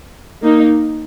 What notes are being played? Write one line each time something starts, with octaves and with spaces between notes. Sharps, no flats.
A#3 D#4